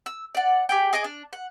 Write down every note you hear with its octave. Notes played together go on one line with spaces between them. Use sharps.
E6
D5 F#5
G4 G#4 G5
G#4 D#5 G#5 D6
D4
F#5